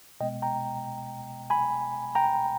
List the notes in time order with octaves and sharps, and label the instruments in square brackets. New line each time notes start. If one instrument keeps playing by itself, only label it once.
[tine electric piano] B2 G#3 B3 D#5 G5
G5 A#5
G#5 B5
G5 A#5